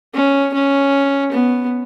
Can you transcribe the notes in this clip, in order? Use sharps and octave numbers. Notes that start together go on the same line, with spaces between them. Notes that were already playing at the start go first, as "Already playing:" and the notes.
C#4
C#4
B3